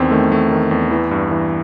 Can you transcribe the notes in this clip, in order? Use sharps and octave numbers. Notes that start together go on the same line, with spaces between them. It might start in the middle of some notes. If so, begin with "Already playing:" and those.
Already playing: E2 D#3 C4
D#3 A3
E2 A3
D#3
E2
E3
G2
E3